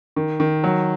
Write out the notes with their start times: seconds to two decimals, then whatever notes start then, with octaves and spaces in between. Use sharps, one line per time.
0.16 D#3
0.40 D#3
0.64 F#3